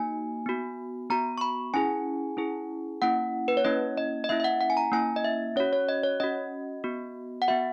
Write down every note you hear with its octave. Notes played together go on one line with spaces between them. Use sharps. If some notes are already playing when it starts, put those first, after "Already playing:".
Already playing: A#3 D#4 F#4 G#5
B3 F#4
B3 F#4 A#5
C#6
B5
C#4 E4 G#4 G#5
C#4 E4 G#4
A#3 C#4 E4 F#5
B4
C#5
A#3 C#4 E4 D#5
D#5
D#5
A#3 C#4 E4 E5
E5
F#5
F#5
G#5
A#5
A#3 C#4 E4 G#5
D#5
E5
C#4 F#4 C#5
C#5
D#5
C#5
C#4 F#4 D#5
B3 F#4
F#5
B3 F#4 E5